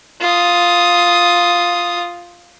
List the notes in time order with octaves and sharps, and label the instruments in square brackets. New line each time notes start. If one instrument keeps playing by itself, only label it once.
[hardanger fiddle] F4 D#6